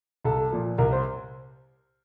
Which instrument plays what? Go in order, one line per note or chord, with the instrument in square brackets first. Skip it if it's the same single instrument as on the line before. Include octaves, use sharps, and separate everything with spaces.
[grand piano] C2 A4
A#2 F3
C2 A#4
C5